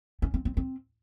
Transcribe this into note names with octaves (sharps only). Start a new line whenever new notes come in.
C#4
C4
C4
C4